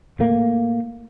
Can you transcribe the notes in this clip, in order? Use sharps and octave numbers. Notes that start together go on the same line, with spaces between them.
A2 A3 A#3